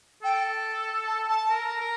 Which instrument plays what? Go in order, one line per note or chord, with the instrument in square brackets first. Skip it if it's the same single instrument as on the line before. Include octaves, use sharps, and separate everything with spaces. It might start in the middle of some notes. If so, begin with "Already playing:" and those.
[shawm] A4 [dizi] G5
[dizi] A5
A5
[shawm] A#4
A#4